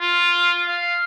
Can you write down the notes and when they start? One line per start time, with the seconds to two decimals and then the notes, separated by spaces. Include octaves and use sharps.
0.01 F4
0.68 F5